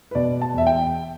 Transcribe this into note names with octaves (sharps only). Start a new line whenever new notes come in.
B4
B2 D5
A5
E2 E5
G5